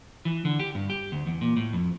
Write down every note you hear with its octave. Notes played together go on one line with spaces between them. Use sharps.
E3
D3
G4
G2
G4
D2
E2
A#2
A2
F2